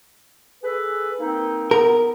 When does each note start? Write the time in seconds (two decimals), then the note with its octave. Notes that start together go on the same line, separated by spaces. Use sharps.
0.64 G#4 A4 B4
1.20 A#3 C4 D#4
1.71 B3 A#4